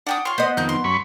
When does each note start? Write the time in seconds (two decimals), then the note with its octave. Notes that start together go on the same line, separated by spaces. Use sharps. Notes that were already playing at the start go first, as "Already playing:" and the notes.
0.07 D4 F#5 G5 D#6
0.25 F4 C#5 C6
0.38 B3 C5 D#5
0.57 F2 D#3 D#4 G6
0.69 C6
0.84 F#2 B5 C#6